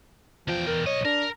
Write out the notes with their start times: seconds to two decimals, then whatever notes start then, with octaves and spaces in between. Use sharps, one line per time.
0.48 E2 F3 G5
0.67 A#4
0.87 B1 C#5 D#5
1.05 D4 A#4